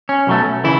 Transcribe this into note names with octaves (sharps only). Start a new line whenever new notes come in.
C#4
B1 B2 F#3 A3
C#3 E3 E4